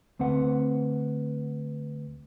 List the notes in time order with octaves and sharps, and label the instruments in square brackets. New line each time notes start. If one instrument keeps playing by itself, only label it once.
[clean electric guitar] D2 C4 B4 F#5